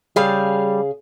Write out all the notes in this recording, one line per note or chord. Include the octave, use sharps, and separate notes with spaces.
C#3 G3 G#4 F5